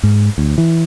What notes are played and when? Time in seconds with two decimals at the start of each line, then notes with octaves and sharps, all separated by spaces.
0.03 G#2
0.38 D2
0.58 E3